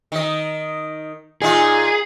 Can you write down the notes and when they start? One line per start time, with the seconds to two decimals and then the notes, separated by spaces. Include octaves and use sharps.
0.12 D#3 D#5
1.42 A#2 D#4 F4 G#4